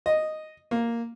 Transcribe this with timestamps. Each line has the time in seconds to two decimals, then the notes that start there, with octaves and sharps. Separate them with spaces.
0.06 D#5
0.71 A#3